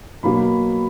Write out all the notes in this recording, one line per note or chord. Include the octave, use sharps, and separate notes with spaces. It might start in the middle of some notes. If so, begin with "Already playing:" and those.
B2 F#3 A#3 B5